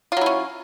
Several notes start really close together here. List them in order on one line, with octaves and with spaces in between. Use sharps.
F4 F#3 E4 C#4